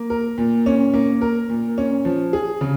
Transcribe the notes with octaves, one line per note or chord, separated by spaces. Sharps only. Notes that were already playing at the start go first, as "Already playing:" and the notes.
Already playing: A#3
A#4
A#2
C#4
A#3
A#4
A#2
C#4
F3
G#4
C#3